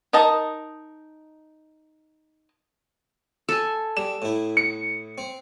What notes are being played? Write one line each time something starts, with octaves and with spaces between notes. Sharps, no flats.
D#4 A#4 D#5 A5
A4 G#5
G3 E7
A2 E4
C#7
C4